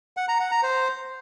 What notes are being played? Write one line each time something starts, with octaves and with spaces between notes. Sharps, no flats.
F#5
A#5
F#5
A#5
C5